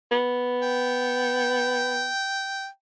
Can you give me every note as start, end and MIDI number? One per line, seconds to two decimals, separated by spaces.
0.12 2.08 59
0.63 2.68 79